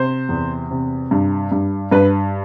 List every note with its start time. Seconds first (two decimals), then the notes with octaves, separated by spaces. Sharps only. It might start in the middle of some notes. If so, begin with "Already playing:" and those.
Already playing: C3 C5
0.29 E2
0.71 C3
1.11 G2
1.52 G2
1.91 G2 B4